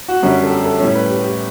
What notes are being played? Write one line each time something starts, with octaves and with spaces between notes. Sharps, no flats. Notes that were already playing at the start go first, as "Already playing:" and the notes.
F#4
F#2 D3 G3 C#4
A4
G4
A4
A2 G3 C#4 C#5
B4
G4
G4